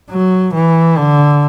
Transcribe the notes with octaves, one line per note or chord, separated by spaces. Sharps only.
F#3
E3
D3